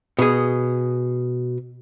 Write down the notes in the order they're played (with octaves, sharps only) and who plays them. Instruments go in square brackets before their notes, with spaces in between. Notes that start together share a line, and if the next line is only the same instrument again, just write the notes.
[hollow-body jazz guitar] B2 G#4